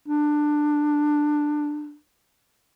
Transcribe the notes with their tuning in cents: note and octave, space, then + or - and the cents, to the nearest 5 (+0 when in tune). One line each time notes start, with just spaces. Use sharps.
D4 +15